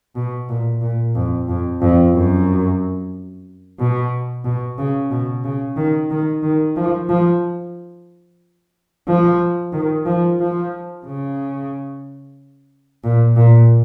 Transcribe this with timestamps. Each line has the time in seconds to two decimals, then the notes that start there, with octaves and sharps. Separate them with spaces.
0.16 B2
0.49 A#2
0.82 A#2
1.15 F2
1.48 F2
1.81 F2
2.14 F#2
3.79 B2
4.45 B2
4.78 C#3
5.11 B2
5.44 C#3
5.77 D#3
6.11 D#3
6.43 D#3
6.76 F3
7.09 F3
9.08 F3
9.73 D#3
10.06 F3
10.40 F3
11.06 C#3
13.04 A#2
13.37 A#2